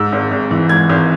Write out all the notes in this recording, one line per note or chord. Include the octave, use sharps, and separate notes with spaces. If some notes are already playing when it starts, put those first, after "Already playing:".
Already playing: G#2 E6
G#1
G#1
E3
G#2 G#6
G#1